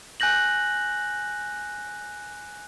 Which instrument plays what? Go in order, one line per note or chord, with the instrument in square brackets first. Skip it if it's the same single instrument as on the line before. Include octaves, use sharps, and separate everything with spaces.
[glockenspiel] G#5 F#6 G6 A#6 F#7